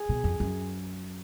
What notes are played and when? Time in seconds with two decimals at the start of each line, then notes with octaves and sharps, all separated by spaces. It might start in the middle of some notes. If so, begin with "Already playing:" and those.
Already playing: G#4
0.09 B2
0.24 F2
0.40 F#2